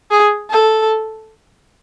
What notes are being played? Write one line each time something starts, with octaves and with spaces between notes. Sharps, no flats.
G#4
A4